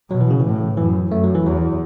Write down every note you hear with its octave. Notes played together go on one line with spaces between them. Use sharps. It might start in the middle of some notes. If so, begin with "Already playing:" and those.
B2 F#3
E3
C#3
A2 E3
F#2 E3
F#2 A3
F#3
E3
E2 F#3